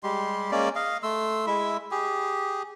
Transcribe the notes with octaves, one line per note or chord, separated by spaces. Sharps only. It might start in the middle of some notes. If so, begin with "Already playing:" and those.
G3 G#3 G4 C6
G#3 A#3 C#4 D5
D#5 F5
A3 C6 E6
G#3 E4 E5
G4 G#4